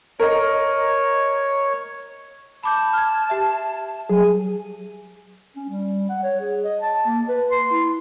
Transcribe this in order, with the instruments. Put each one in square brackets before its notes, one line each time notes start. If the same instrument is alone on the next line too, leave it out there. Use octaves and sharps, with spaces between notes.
[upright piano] A#4 D#5 [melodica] C#5
[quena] A5 [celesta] B5 D6 G6
[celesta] F6 G#6
G4 E5
[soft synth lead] F#3 [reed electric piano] G#4 [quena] G#5
[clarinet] C#4
G3
F#5
C#5
G#4
D#5
A5
A#3
B4
C6
E4